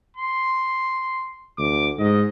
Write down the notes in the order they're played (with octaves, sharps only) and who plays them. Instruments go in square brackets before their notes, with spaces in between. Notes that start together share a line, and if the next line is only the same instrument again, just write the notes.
[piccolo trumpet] C6
[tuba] D2 [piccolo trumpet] D6
[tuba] G#2 [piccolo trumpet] D#5